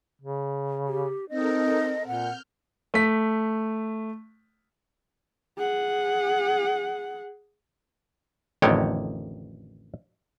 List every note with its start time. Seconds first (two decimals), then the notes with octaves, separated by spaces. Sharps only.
0.22 C#3
0.88 G4
1.29 C4 D#4 A4 A#4 D#5
2.07 A#2 F#5 F6 G6
2.94 A3 B6
5.58 G#4 F#5
8.62 A1 F2 D3 D#3 C#5 G5